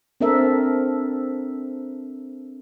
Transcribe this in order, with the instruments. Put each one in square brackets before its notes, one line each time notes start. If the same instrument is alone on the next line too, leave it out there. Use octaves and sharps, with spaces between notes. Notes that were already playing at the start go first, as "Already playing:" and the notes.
[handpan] C4 D4 A4 A#4 E5